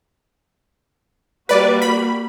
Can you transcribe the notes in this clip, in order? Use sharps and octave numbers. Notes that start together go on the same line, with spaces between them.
G3 A#3 F#4 B4 D5
B5